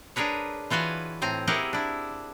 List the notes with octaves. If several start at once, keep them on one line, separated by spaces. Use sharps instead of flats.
D4 G#4 A#4 B4 C#5
E3 F4 F#4 B4 G#5
A2 C4 G#5 A#5
E4 G4 G#4 A#4 D#5 F#5
D4 E4